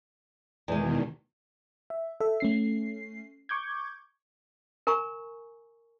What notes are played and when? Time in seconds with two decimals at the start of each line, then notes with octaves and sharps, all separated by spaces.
0.68 E2 B2 D#3 G#3
1.90 E5
2.20 A4 E5
2.40 A3 C#4 C7
3.49 C#6 D6 G6 G#6
4.87 A#4 G#5 A#5 C#6